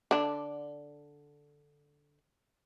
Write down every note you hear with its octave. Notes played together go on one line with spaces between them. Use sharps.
D3 D4